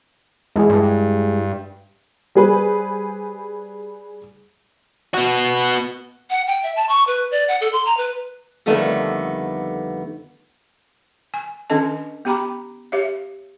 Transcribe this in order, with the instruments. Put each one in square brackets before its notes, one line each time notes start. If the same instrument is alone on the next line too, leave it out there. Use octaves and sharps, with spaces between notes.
[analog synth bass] E2 [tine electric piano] G#3 E4 G#4
[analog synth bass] G2
[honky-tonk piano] G3 G#4 B4 C5
[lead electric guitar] B3 F#4
[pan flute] F#5
G5
E5
A5
C#6
B4
D5
F#5
A4
C6
A#5
B4
[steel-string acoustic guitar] F2 D3 D#3 G3 A3 B3
[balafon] G#5
D#3 C#4 D4 A4 D#5 A5
B3 G4 G5 A#5 B5 D6
G4 C#5 E5 F5